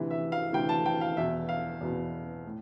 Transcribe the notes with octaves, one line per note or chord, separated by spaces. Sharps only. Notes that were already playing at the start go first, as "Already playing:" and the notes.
Already playing: D2 C3 E3
E5
F5
D2 C3 E3 G5
A5
G5
F5
E2 B2 E5
F5
E2 B2
A2